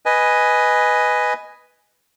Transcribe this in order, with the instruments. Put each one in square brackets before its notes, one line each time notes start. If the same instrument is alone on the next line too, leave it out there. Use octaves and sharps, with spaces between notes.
[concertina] B4 D#5 G#5